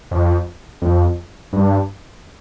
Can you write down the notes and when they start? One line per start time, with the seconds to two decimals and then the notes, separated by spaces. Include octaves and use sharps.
0.11 F2
0.82 F2
1.53 G2